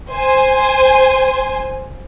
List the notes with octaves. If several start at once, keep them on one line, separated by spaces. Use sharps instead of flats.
C5 G#5